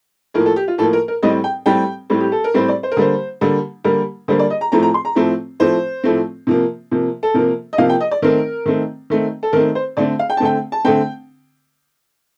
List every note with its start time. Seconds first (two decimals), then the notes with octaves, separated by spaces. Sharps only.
0.34 A2 F3 A#3 A#4
0.46 A4
0.56 G4
0.68 F4
0.78 A2 F3 A#3 A4
0.93 A#4
1.08 A#4
1.23 A2 G3 C4 D#5
1.44 G5
1.66 A2 G3 C4 G5
2.10 A2 G3 C4
2.21 G4
2.32 A4
2.44 A#4
2.54 A2 G3 C4 C5
2.68 D5
2.83 C5
2.92 A#4
2.97 D3 G3 A#3 C5
3.41 D3 G3 A#3
3.84 D3 G3 A#3 A#4
4.28 D3 G3 A#3 C5
4.39 D5
4.50 D#5
4.61 A#5
4.72 A2 F3 A3 C4 A#5
4.83 A#5
4.94 C6
5.05 A#5
5.15 A2 F3 A3 C4
5.60 A2 F3 A3 C4 C5
6.04 A2 F3 A3 C4
6.47 C3 F3 A#3
6.91 C3 F3 A#3
7.23 A4
7.34 C3 F3 A#3 A#4
7.73 D#5
7.78 C3 F3 A#3 F5
7.90 G5
8.01 D#5
8.11 D5
8.22 D#3 A3 C4 A#4
8.66 D#3 A3 C4
9.10 D#3 A3 C4
9.43 A4
9.53 D#3 A3 C4 A#4
9.75 C5
9.97 D3 A3 C4 D5
10.19 F5
10.30 G5
10.37 A5
10.40 D3 A3 C4 G5
10.72 A5
10.85 D3 A3 C4 G5